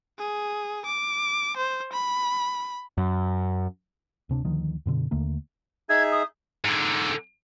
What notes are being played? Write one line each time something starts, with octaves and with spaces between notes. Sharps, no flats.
G#4
D6
C5
B5
F#2
D1 C3 D4
D2 D3 D#3 F3
F#2 B2 D3
D#2 D3 A3 A#3
D#4 G#4 E5 G#6
D#6
G#2 D3